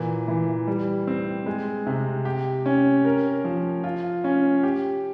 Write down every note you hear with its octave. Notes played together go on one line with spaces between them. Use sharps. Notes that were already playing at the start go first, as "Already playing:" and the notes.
Already playing: A#2 E3
E3
G3
C4
G#3
C3
G4
C#4
A#4
F3
F4
C#4
G4